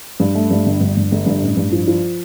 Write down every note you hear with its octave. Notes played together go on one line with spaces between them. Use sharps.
G2
A3
G2
G1
G2
G1
G1
G2
A1
G2
F3
F3